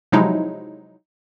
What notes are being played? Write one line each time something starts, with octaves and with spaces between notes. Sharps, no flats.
C3 F3 F#3 G#3 D#4 E4